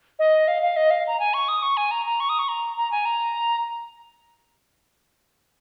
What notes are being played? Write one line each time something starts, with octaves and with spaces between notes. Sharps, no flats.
D#5
F5
F5
D#5
F5
A#5
G#5
C#6
D#6
C#6
G#5
A#5
A#5
C#6
D#6
C#6
A#5
A#5
G#5
A#5